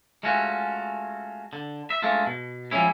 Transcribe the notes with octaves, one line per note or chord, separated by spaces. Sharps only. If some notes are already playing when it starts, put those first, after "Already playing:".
G#3 A3 C#4 F4 F#4
D3
E5
G#3 A3 C#4 D4 F4
B2
F3 G3 G#3 C#4 E4